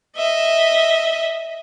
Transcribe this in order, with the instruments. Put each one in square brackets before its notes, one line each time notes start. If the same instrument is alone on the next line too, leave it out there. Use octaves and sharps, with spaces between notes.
[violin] D#5 E5